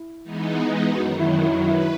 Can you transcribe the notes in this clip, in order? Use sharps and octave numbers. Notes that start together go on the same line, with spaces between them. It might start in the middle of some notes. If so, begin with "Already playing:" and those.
Already playing: E4
E3 G#3 B3 D#4
F#2 D#3 F#3 F#4
E4
E4
E4 B4